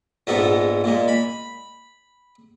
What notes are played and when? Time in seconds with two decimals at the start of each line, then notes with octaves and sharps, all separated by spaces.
0.27 A#1 G#2 G#3 B3 A4
0.84 A#2 G#3
1.08 B5